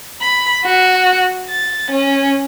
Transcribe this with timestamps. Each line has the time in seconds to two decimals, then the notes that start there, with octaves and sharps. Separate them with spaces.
0.21 B5
0.65 F#4
1.50 A6
1.91 C#4